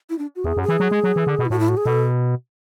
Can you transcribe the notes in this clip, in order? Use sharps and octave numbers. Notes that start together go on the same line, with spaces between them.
E4
D4
F#4
E2 G#4
F#2
G#4
E3
F#3
G#3
F#3
E3
D3
B2
E4
A2 F#4
E4
F#4
G#4
B2 A4